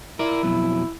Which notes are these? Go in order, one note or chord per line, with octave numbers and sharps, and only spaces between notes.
E4 A#4 D5
F2 B2 F#3